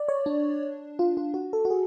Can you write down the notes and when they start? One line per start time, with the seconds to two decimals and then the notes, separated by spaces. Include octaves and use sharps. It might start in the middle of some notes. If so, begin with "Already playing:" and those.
Already playing: D5
0.08 C#5
0.26 D4
0.99 F4
1.17 F4
1.34 F#4
1.53 A4
1.65 F#4
1.70 G#4